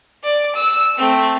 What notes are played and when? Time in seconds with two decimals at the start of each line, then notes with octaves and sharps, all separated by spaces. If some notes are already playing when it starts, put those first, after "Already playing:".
0.23 D5
0.55 E6
0.98 A3 C4